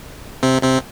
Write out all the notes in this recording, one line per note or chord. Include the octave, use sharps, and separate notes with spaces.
C3 C4
C3 C4